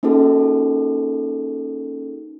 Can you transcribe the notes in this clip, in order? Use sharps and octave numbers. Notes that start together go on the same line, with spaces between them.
A#3 C#4 D#4 F#4 G#4 A4